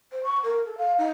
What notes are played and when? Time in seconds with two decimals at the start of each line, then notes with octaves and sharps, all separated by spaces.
0.12 C5
0.23 C#6
0.43 A#4
0.65 A4
0.77 F5
0.98 D#4